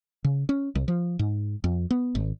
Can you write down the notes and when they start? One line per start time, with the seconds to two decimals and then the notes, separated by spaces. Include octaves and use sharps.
0.24 C#3
0.49 C#4
0.75 C2
0.88 F3
1.19 G#2
1.64 F2
1.91 B3
2.15 G#1